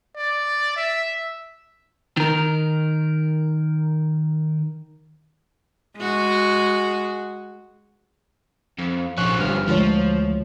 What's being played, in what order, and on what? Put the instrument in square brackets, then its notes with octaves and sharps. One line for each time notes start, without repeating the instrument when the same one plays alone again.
[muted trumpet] D5
E5
[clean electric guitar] D#3 A#4
[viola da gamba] G#3 F#4
[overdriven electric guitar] F2
[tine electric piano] A#1 C#6 F#6 [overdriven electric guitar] F3 C#4
[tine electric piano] G1 G2 F6
[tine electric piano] D2 [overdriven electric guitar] F3 [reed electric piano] G#3 C#5